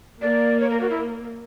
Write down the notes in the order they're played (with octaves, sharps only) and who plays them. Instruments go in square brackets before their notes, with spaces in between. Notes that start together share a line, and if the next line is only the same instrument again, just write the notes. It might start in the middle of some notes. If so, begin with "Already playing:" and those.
[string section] A#3 [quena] D5
[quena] C#5
A#4
F#4
E4